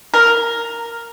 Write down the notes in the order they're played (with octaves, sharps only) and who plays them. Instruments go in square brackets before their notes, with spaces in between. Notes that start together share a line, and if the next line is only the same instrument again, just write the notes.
[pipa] A#4